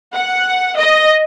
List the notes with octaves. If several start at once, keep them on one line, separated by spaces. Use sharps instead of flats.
F#5
D#5